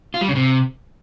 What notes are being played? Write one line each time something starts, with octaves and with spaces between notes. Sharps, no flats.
F4
G3
C#3
C3